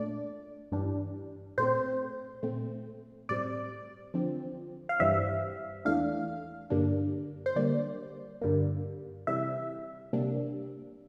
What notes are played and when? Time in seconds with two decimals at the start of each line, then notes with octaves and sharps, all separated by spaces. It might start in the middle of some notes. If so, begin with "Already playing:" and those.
Already playing: A#2 A3 D4 D5
0.72 G2 E3 G3 D4
1.58 A#2 A3 C4 C5
2.43 A#2 A3 C4
3.29 A2 G3 C4 D5
4.14 D3 F3 C4
4.89 F5
5.00 G2 E3 G3 C4 E5
5.85 E2 E3 A3 D4 F5
6.70 G2 D3 G3 A#3 D4
7.46 C5
7.56 D3 G3 A#3 D5
8.42 G2 D3 G3 A#3
9.27 C3 E3 G3 E5
10.13 C3 G3 A#3 D4